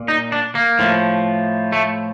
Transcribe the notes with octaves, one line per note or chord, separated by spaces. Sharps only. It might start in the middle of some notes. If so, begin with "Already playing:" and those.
Already playing: A#2
D#4
D4
A#3
A2 F3
A3